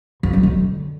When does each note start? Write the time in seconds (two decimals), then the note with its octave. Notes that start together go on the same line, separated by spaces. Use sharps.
0.23 F3
0.33 F#3
0.43 D3